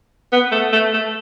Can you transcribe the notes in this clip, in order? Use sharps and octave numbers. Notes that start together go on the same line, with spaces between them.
B3
A3
A3
A3